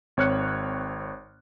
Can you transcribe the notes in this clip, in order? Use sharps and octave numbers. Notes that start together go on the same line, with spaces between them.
G#1 C4 C#5 F6 F#6 C#7